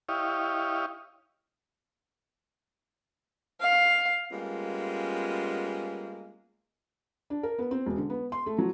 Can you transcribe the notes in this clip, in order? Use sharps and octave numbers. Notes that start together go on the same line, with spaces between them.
E4 G4 C#5 D#5 F5
F5
G3 G#3 A#3 B3 C#4 F4
D4
A#4
B3
C4
E1
D3
B3
C6
A3
F#3